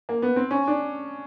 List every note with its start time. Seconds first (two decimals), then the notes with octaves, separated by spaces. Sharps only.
0.09 A#3
0.22 B3
0.36 C4
0.51 C#4
0.67 D4